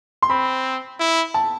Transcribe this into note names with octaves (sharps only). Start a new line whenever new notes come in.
C6
C4 B5
E4
A5